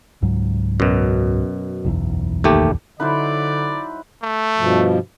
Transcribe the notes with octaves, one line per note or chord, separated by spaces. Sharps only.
C#2 G#2 F#3
F#2 B2
F#1 B1 E2
D#2 A3 G4
D3 F#3 D#4 E4 B4 C5 D5
A3
G2 B2 F3